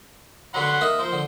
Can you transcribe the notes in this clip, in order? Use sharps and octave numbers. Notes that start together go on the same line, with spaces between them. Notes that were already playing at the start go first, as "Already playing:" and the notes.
D3 F#3 F#5 B5 C6
A#3 D#4 E5
F3 C5
D3